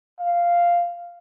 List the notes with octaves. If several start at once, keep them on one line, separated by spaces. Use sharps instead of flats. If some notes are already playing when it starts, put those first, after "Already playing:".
F5